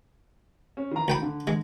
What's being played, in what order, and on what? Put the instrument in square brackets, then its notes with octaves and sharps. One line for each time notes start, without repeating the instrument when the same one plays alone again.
[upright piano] C#4
D#3 E3 A#5
[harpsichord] D2 G5 B5
[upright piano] D3
[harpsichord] G#3